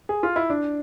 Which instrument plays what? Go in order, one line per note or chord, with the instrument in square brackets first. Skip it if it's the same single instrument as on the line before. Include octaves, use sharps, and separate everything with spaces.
[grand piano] G#4
F4
E4
D4